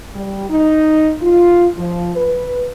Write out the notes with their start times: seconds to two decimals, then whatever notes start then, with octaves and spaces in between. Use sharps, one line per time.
0.14 G3
0.50 D#4
1.21 F4
1.78 F3
2.16 B4